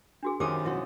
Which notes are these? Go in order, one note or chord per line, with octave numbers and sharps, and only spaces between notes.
D4 F#4 G#4
F#2 D#3 F3 G4 D6 D#6
B2 E4 F#4 C#5